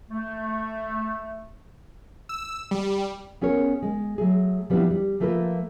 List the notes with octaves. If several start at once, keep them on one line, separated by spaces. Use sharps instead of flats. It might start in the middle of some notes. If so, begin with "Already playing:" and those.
A3
E6
G3
B3 C#4 G#4 A#4 C#5
G#3
F#3 A3 G#4
F3 G3 B3 C4 D4 E4
G3
F3 A3 A#3 F4 A4 B4